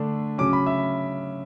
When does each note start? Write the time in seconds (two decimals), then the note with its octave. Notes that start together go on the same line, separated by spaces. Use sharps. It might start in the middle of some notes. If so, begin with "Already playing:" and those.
Already playing: D3 A3 D4
0.38 C#3 F#3 C#4 D6
0.53 B5
0.66 E5